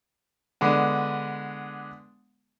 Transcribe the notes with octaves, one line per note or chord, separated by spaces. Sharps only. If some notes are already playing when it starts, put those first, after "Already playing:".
D3 G#3 B3